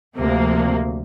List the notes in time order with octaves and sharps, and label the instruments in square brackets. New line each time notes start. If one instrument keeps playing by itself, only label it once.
[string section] D2 C3 F3 A#3